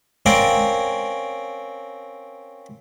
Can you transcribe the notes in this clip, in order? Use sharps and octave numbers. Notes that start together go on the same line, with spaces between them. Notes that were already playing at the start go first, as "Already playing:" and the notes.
C4 C#4 A#4 D5 F5